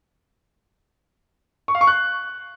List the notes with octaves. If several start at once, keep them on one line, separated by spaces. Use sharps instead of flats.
C#6
F5
C#6
F#6